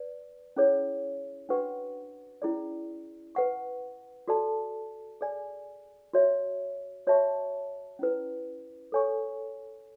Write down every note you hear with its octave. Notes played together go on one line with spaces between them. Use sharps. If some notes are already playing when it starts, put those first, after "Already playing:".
Already playing: B4 D5
C#4 E4 G#4 C#5
D4 F#4 B4 F#5 C#6
C#4 E4 G#4 D5
B4 F#5 C#6
F#4 A4 D5 A5
G#4 D5 G#5
F#4 C#5 E5
F#4 C#5 E5 A5 C#6
C#4 E4 B4
A4 C#5 G#5 C#6